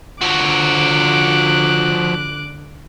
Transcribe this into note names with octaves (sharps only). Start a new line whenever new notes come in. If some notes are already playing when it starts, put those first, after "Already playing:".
D3 F3 F#4 D6 F#6